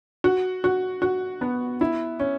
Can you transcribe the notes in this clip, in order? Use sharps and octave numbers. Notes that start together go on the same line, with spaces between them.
F#4
F#4
F#4
B3
E4
C#4